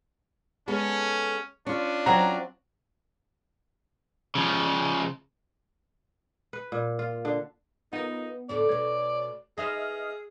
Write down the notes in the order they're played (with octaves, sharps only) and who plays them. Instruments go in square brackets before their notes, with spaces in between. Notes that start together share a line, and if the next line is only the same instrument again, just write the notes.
[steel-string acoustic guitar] G#3 B3 A4 [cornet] C#4
[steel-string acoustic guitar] C#4 F4 [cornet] D4
[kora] F#3 C4 F#4 [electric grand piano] A#5
[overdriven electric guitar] C#3 F3
[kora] B4
A#2
F4
D3
[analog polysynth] B3 [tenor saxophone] D#4 [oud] F4 A#4
[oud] D2 A2 A4 [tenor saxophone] D5
[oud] B2 A3 [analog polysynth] C#5
[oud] D#4 B4 C5 [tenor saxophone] G#4 [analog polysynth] D#5 E5 F6